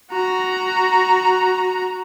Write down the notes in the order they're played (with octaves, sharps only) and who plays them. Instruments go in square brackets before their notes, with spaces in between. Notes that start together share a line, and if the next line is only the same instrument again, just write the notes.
[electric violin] F#4 A#5